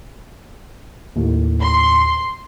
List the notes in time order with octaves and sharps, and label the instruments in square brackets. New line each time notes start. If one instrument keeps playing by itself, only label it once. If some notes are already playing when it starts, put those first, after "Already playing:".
[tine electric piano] D#2 A2
[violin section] C6